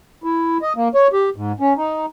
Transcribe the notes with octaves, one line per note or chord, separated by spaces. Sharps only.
E4
D#5
A#3
C#5
G4
G#2
C#4
D#4